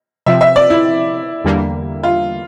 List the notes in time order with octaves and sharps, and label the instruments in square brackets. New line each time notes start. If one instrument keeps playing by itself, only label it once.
[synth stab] C3 F3 C4 [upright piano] E5
[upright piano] E5
D5
E4
[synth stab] E2 D3 G3 A#3
[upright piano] F4